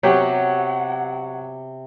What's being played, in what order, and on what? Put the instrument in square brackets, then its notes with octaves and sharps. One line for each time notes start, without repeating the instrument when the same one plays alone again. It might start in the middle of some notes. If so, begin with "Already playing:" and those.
[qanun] C3 B3 [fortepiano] F#3 G4 [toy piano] C#5 [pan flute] F#5